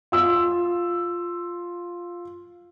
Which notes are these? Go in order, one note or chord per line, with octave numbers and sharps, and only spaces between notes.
F4 E6